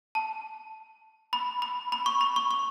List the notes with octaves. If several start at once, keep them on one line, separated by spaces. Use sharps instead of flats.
A5
B5
B5
B5
C#6
B5
C#6
C#6